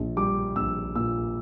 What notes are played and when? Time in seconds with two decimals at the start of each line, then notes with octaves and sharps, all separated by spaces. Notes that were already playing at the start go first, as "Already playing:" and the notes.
Already playing: A#1
0.17 G3 D6
0.56 A#1 E6
0.95 A#2 E6